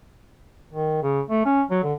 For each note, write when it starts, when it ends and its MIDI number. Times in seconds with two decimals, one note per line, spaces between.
0.72 0.98 51
1.02 1.21 49
1.30 1.42 57
1.46 1.62 61
1.71 1.80 54
1.84 1.94 50